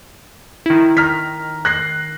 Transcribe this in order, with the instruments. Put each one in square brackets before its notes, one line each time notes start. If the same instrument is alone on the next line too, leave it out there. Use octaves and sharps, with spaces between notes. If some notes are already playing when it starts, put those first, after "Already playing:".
[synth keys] D#3 E4
[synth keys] D#3 [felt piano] A#5 F6 B6
[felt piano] F#6 A#6 C7